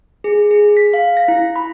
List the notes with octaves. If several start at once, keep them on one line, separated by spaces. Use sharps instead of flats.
G#4
G#4
B6
F5
A#6
E4
B5